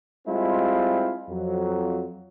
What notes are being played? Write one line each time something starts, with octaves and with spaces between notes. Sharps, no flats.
G3 G#3 C4 E4 F4
F2 F#3